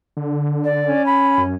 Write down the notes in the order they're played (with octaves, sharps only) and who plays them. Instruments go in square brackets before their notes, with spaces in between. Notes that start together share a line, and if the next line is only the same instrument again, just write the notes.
[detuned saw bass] D3
[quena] D5
[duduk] C#4
[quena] B5
[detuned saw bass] F#2